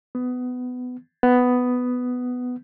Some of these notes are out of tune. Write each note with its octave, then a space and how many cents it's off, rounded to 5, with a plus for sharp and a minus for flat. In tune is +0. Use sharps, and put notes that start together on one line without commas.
B3 +20
B3 +10